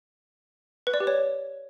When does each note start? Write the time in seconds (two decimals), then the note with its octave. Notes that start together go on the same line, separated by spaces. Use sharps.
0.87 B4
0.94 D5
1.00 G4
1.07 C#5